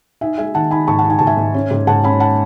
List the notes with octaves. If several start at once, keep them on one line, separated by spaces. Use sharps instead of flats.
D#4 E5 G#5
G#3 E5 G#5
D#3 F#5 A5
D#4 G#5 B5
G#2 A5 C#6
F#5 A5
D#4
G#5
G#2 A5
E5 G#5
G#2
C#4
G#2
G#2 F#5 A5
C#4 G#5 B5
F#5 A5